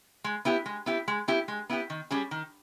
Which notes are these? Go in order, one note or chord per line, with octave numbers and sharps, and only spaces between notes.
G#3
B3 E4 G4
G#3
B3 E4 G4
G#3
B3 E4 G4
G#3
B3 E4 G4
D#3
G3 C#4 G#4
D#3